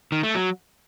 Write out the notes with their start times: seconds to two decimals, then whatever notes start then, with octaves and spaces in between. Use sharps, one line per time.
0.12 D#3
0.23 A3
0.35 F#3